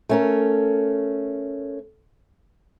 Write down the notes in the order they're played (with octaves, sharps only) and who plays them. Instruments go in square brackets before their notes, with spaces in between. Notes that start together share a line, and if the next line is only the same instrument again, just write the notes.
[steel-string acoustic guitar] A3 C#4 A#4